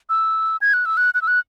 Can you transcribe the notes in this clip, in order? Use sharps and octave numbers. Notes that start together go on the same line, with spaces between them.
E6
G#6
F#6
E6
F#6
F#6
E6
F#6